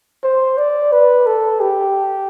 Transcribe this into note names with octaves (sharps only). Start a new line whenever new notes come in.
C5
D5
B4
A4
G4